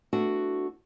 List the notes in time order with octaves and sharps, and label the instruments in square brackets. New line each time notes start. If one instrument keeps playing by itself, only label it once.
[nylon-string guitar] A3 B3 D4 E4 F#4 A4